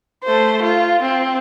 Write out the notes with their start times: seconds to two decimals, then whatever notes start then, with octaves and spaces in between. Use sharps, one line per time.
0.24 A3 C5
0.63 F4
1.02 C4